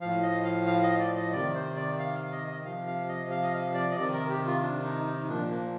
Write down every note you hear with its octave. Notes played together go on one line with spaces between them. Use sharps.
A2 F3 F5
D#5
F5
F5
D#5
D5
D#5
C3 D#3 D5
C5
D5
F5
F5
D#5
D#5
C3 F3 F5
F5
D#5
F5
D#5
F5
D5
D#5
C3 D#3 D5
A#4
G4
F4
D4
D#4
D#4
A#2 F3 D4
A#3